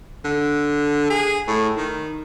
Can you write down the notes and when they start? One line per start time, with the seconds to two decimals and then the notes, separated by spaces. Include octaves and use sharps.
0.25 D3
1.10 G#4
1.47 A2
1.77 D#3